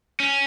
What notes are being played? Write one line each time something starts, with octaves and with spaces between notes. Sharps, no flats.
C#4